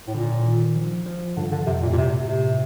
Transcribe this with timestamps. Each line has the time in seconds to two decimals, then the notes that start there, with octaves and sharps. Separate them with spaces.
0.08 A2
0.15 A#2 D3
0.45 D#3
0.76 F3
1.06 F3
1.37 G2 D3
1.52 D3
1.67 F2 C3
1.82 A#2
1.89 A2
1.93 A#2
1.97 G2 C3
2.27 A2 C3